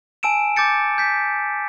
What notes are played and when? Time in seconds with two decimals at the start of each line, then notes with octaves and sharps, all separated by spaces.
0.23 G#5 A5 E6 D7 E7
0.56 D6 G6 A6 C#7
0.98 G6 B6